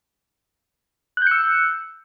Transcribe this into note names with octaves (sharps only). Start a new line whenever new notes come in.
E6 F#6 G6 C#7